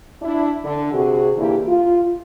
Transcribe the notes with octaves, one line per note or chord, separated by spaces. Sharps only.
D4 E4
D3
C3 F#4 G#4
A#2 D3 E3 A#3 E4 G4
F4